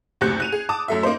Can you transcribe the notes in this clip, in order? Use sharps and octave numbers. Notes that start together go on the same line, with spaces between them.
F#1 D2 C3 F#6 G6 C#7
F#6 D#7 F7
G#4
A5 D6 D#6
F#2 A3 E5
A#3 D#4 C5